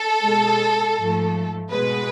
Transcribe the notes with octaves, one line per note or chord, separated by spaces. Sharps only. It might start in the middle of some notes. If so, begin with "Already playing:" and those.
Already playing: A4
B2 G#3
G#2 F3 A3
B2 G#3 B4